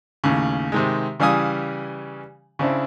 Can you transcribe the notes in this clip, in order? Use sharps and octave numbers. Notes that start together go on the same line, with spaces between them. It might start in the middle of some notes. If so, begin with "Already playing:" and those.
D#2 A2 C#3
C3 D#3 G#3
C#3 E3 G3 F5 G#5 D#6
C#3 C4 D4 E4